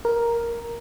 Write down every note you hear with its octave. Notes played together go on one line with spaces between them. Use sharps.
A#4